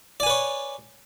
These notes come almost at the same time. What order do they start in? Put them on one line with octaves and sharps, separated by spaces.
D5 G#5 B4 C#5